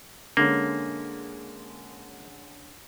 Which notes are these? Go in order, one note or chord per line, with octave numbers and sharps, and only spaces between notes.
D3 G#3 A#3 C#4